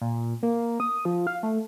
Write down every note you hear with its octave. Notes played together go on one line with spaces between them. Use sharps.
A#2
A#3
D#6
F3
F5
A3